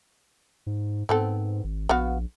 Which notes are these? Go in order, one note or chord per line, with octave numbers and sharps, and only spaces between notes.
G#2
G#2 B3 C4 A4
G#1
A#1 B3 F#4 F5